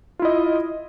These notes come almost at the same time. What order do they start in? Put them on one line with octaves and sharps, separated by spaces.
F4 E4 D#5